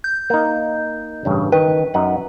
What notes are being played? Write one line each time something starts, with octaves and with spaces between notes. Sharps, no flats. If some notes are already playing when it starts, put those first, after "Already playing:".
G6
A#3 D#4
A1 G2 C#3
D#3 B4 G5
F#2 D#4 F#5